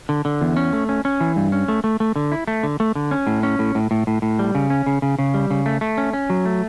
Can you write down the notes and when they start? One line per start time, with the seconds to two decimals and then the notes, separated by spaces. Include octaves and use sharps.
0.09 D3
0.25 D3
0.42 E2
0.57 C#4
0.73 A3
0.89 C#4
1.05 C#4
1.20 E3
1.36 G2
1.52 C#4
1.68 A3
1.84 A3
2.00 A3
2.16 D3
2.32 E4
2.47 A3
2.63 D3
2.80 A3
2.95 D3
3.11 C#4
3.27 A2
3.43 C#4
3.59 A2
3.75 A2
3.91 A2
4.07 A2
4.22 A2
4.39 G3
4.55 C#3
4.70 C#4
4.87 C#3
5.02 C#3
5.19 C#3
5.34 G3
5.51 C#3
5.66 A3
5.81 A3
5.98 C#4
6.13 C#4
6.30 F#3
6.45 A3